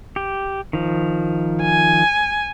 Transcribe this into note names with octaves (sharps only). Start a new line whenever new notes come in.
G4
D#3 F3
G#5